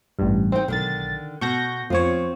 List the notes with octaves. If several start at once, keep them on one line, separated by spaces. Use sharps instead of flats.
A1 G2
C4 D#4 G5
B1 D3 D#3 A6
B2 C#6 G6 A#6
F2 C4 F4 C#5